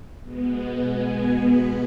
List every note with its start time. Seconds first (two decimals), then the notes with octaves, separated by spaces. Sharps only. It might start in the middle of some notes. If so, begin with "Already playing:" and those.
0.22 B2 G#3 B3
0.84 G#5
1.45 B5